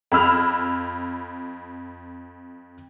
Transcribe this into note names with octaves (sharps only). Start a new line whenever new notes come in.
F2 B5 E6 F6